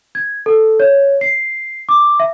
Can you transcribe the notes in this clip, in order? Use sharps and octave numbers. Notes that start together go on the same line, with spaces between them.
G#6
A4
C#5
C7
D6
E5